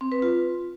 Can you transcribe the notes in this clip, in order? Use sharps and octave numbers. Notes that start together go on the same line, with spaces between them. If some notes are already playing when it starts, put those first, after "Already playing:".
C4
B4
F4